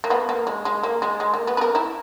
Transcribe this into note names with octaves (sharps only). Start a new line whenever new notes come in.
A#3
B3
A#3
G#3
G#3
A#3
G#3
G#3
A#3
B3
B4
A#4
E4